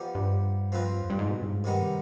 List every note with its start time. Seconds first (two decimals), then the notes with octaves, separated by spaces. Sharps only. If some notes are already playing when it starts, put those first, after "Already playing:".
Already playing: F3 B3 D#4 G4 D5
0.15 G2
0.72 F3 C4 F4 B4 D#5
1.01 F2
1.10 G2
1.19 G#2
1.30 B2
1.42 G2
1.53 G#2
1.64 G2 C3 D#3 G3 B3 D#4